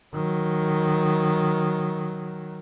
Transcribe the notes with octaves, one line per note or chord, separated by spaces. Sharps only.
D#3 F#3